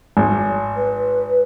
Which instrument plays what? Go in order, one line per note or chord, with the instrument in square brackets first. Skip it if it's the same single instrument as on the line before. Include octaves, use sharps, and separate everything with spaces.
[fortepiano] G#1
[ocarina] B4